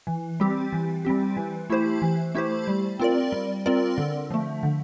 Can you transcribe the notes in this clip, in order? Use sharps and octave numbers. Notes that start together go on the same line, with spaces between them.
E3
G3 C4 G4
E3
G3 C4 G4
E3
A3 E4 G4 C5
E3
A3 E4 G4 C5
G3
C4 F4 A#4 D5
G3
C4 F4 A#4 D5
D3
F3 A3
D3